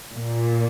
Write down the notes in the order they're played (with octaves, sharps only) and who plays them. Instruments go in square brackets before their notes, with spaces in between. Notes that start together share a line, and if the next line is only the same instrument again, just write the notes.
[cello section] A#2